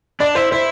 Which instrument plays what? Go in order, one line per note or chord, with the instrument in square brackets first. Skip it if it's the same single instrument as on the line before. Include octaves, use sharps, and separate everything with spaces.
[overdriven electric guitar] D4 [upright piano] D5
[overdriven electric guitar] E4 [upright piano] C5
[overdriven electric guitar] E4 [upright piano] C5